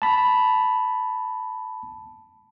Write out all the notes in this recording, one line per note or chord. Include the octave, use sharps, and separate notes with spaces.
A5 B5